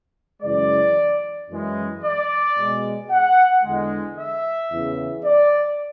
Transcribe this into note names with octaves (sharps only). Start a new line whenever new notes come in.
F#2 C#3 E3 G#3 D5
F#2 E3 G#3
D5
B2 G#3
F#5
E2 D3 G#3
E5
E2 C#3 E3
D5